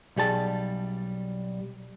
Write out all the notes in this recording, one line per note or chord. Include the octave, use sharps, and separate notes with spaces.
B1 G3 G#4 A5